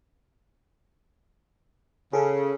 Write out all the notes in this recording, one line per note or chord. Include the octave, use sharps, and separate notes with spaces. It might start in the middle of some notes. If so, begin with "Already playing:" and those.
C#3 G#4 A4